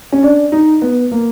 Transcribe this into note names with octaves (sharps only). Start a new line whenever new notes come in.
C#4
D4
D#4
B3
A#3